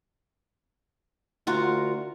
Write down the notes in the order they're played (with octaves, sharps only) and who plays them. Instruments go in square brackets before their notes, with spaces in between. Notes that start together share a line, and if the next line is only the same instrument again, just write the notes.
[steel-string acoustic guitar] D2 F4 F#4 A#4 A#5